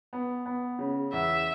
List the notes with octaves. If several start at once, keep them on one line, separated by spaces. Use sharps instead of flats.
B3
B3
C#3
E2 E5